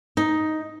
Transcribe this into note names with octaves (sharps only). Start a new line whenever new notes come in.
D#4